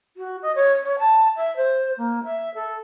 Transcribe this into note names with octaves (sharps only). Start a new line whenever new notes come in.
F#4
D#5
C#5
C#5
A5
E5
C5
A#3
E5
A4